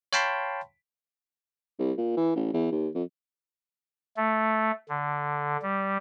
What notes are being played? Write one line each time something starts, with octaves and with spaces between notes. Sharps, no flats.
C#5 F5 G5 A5 B5 C6
C2
A#2
E3
A1
E2
D#2
F2
A3
D3
G3